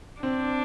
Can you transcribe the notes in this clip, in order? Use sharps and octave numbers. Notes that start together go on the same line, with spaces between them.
C4 D4